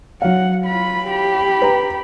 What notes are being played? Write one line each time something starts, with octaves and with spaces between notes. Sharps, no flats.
F#3 F5 F#5
F4 B5
G4 B5
B4 G5 A#5